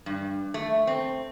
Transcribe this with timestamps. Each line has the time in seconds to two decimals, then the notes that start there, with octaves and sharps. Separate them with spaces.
0.06 G2
0.54 A3
0.87 C4